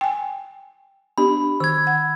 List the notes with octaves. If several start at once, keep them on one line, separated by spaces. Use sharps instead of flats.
G5 G#5
B3 D4 G4 B5
D#3 E6 G#6
F#5